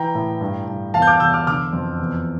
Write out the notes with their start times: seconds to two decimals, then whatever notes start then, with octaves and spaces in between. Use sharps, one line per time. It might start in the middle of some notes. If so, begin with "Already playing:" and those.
Already playing: E3 G5 A#5
0.15 A2
0.41 G2
0.68 G2
0.94 E2 F5 A5
1.02 G6
1.07 D6 F6
1.20 E2 E6 G6
1.33 D6 F6
1.47 D3 D6 F6
1.73 F2
1.99 E2